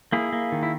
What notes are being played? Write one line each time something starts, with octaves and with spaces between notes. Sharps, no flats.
A#3 E4 G#4
A#3
D#3
E4